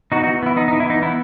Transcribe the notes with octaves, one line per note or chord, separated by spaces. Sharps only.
B3 D#4 F#4
D#4 F#4
E3
B3 E4
B3 D#4
D#4
E3
E4
B3 D#4
B3 E4